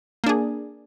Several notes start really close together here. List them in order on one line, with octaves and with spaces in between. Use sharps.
A#3 D4 G#4